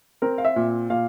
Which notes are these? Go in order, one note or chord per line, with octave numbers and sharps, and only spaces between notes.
C4 A#4
F5
E5
A#2
A#2 F5